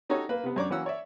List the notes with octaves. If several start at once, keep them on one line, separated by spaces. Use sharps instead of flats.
C#4 D#4 F#4 G4 A4 C#5
A#3 B4
C3 B3
F#2 D4 C#5 D5 A#5 D6
E3 F#3 A#3 C#4 F#5 E6
C#5 D5 E5